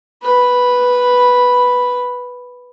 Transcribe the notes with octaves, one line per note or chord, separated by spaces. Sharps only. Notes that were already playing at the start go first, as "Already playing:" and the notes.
B4 B5